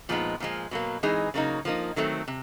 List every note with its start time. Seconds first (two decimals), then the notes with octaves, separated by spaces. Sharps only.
0.09 A#2 F3 G#3 B3 D#4
0.40 A#2 F3 G#3
0.71 B2 F#3 A#3
1.03 E3 G#3 C4 D#4 G#4
1.34 C#3 F#3 A#3 D#4
1.65 F3 A#3 D#4
1.96 D#3 F#3 A3 C4
2.28 C3